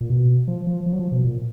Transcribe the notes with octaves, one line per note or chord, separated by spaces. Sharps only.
A#2
B2
F3
F3
F3
F#3
F3
B2
A#2